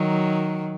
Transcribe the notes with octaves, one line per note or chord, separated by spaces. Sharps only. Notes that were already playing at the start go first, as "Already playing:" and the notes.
Already playing: D#3 F#3